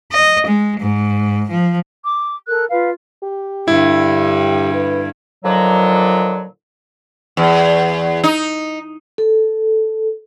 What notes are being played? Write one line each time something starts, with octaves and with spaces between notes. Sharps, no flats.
D#5
G#3
G#2
F3
D6
A4 A#4 F#6
F4 B4 F5
G4
G2 D3 E4
B4
A#2 D3 D#3 F3 F#3
E2
D#4
A4